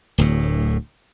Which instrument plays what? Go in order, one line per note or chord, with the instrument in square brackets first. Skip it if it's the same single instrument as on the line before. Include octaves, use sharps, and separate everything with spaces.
[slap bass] D1 D2 A2